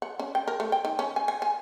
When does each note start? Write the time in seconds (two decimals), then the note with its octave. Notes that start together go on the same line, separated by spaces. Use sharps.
0.02 F#5
0.19 C#4
0.35 G5
0.48 A#4
0.60 A3
0.72 G5
0.85 D#3
0.99 C#4
1.16 G#5
1.28 G#5
1.42 G#5